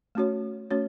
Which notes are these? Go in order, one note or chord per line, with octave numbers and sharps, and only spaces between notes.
A3 C#4 F#4 C#5
A3 C#4 F#4 C#5